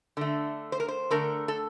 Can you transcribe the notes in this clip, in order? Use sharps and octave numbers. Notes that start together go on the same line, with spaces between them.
D3 A3
C5
A#4
C5
D3 A3 A#4
A4